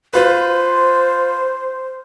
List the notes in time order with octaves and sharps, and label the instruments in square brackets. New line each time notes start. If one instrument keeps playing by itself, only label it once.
[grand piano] F4 B4 [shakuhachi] C5